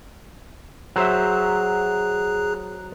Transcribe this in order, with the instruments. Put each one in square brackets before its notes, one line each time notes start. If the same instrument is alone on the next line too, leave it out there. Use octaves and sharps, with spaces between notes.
[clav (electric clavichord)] F#3 C5 E5 [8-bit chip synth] G#4 A#5 F#6